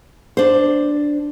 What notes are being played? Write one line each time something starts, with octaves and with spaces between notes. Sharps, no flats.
D4 C5